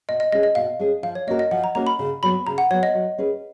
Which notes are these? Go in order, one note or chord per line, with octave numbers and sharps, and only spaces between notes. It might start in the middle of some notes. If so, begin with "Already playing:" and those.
B2 D#5
D#5
G#3 C#4 G#4 D#5
D#5
B2 F5
G#3 C#4 G#4
F3 F5
C#5
A#3 C#4 F#4 A#4 D#5
D#5
F3 F#5
A#5
A#3 C#4 F#4 A#4 A#5
B5
C#3
F#3 B3 B5
C#3 A#5
F#5
F#3 B3 C#5
D#5
F#3
C#4 G#4 B4